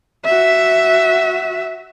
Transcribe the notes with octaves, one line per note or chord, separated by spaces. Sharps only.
F#4 E5